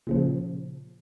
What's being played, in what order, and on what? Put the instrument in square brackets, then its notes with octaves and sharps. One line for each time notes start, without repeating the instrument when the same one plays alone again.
[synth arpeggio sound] A#2 C#3 F3